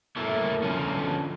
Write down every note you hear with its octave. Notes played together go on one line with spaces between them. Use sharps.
A3 A#3 E4
D3 F3 C#4